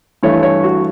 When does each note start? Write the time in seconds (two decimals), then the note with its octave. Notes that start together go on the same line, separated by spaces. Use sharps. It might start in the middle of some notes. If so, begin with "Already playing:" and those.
0.23 G2 E3 A3 C#5
0.43 C#5
0.64 F#4